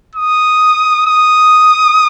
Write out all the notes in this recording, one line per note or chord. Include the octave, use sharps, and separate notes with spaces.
D#6
D#6